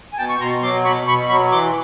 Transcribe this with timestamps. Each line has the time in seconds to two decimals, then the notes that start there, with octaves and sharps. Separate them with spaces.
0.13 G#5
0.18 B2 G5 A5
0.29 C#6
0.40 B2 A#5 C6
0.62 F#3 C6 D6
0.84 B2 B5 C#6
1.07 B2 B5 C#6
1.29 F#3 B5 C#6
1.51 E3 C6 D6